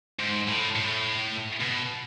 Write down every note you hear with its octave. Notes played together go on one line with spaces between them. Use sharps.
G#2
A2
A2
B2